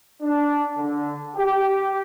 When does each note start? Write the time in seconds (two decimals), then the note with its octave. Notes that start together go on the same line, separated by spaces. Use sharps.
0.21 D4
0.77 D3
1.36 G4